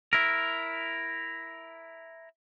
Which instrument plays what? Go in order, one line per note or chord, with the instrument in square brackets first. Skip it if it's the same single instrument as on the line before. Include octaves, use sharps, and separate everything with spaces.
[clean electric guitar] E4 A#4